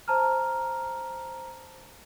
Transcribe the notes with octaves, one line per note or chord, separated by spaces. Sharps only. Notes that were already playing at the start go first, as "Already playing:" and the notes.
C5 A5 A#5 F6